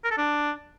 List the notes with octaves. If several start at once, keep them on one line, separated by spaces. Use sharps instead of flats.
A#4
A4
D4